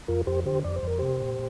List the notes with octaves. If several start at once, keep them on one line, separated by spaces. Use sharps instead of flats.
F2 F4 A#4
F2 G4 C5
D3 G4 C5
F2 D5
C5
F2 A#4
C3 G4 C5
A#2